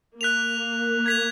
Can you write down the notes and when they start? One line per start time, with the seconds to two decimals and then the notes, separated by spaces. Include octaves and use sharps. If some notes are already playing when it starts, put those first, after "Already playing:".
0.21 A#3 F#6 B6 F7
1.06 G#6 B6 F7